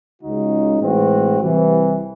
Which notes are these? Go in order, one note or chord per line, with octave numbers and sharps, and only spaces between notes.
C#2 C#3 G#3 D#4 F#4
A2 E3 G#3 C4 F#4
C2 C3 E3